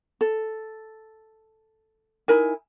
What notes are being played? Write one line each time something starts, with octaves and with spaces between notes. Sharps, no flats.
A4
D#4 E4 A#4 G#5